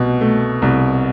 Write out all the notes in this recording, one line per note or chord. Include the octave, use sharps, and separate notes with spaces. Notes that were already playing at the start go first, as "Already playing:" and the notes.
Already playing: C2 B2
A3
C2